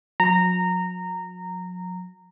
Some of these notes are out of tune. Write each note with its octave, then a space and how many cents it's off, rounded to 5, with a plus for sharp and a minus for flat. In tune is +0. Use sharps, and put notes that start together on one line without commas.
F#3 -40 A#5 -15